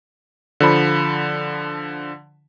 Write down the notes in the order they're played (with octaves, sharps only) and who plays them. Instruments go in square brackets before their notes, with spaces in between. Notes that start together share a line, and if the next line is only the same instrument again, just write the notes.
[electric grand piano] D3 F3 B5